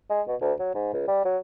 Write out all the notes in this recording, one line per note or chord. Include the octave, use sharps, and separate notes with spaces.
G#3
B2
D2
F#3
G#2
C#2
G3
F#3